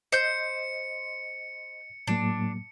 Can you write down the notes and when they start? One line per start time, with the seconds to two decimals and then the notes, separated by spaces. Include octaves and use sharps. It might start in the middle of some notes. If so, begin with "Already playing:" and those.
0.12 C5 D#5 G6 C#7
2.07 A2 F#3 A#3 D4